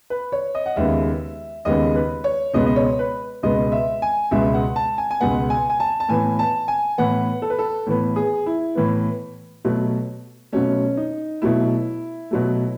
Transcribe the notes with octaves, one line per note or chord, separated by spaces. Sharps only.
B4
C#5
D#5
F#5
D#2 C#3 G#3 B3 E5
D#2 C#3 G#3 B3 D#5
B4
C#5
C#2 B2 G#3 B3 D#5
D#5
C#5
B4
C#2 B2 G#3 B3 D#5
E5
G#5
C#2 B2 G#3 B3 E5
F#5
A5
G#5
G#5
C#2 B2 G#3 B3 F#5
G#5
G#5
A5
A5
A2 E3 B3 G#5
A5
G#5
A2 E3 B3 F#5
A4
B4
A4
A2 E3 B3
G#4
E4
A2 E3 B3
B2 F#3 A3
B2 F#3 A3 C#4
D#4
B2 F#3 A3 E4
B2 F#3 A3